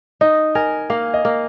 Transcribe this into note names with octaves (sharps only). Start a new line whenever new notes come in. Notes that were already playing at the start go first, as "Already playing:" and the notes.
D#4 D#5
A#4 G#5
A#3 F5
D#5
A#3